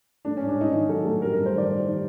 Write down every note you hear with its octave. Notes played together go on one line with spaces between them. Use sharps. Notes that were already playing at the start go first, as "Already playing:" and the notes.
A3 D4
C#4
G#2
D4
G#2 D#4
D#3 D#4
F#3 A4
A3 A4
G3 A#4
A#4
G2
C5
D#3 D5
G3
D#3